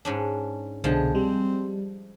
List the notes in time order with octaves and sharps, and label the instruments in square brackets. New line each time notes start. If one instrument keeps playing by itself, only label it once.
[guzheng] G#2 C#4 D4
[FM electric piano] C2 B2 D4 [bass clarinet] D3 [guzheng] F3 G#3 A5
[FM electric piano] G3 [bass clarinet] C4